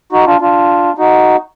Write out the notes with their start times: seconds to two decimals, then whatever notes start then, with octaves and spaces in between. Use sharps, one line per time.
0.12 D#4 F#4
0.26 D4 F4
0.41 D4 F4
0.98 D#4 F#4